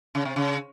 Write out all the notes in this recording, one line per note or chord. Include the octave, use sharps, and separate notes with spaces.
C#3
C3
C#3